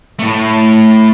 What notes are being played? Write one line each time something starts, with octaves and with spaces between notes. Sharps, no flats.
A2 A3